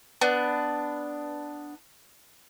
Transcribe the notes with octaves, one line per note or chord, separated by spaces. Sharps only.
B3 D4